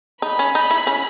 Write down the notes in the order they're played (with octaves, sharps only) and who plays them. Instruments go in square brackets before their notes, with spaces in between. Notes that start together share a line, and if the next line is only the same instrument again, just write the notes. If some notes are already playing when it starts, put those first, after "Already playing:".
[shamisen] D#4 [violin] B5
[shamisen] C#4
D#4
E4
C#4